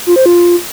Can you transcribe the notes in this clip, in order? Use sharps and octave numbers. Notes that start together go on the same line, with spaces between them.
F4
C5
F4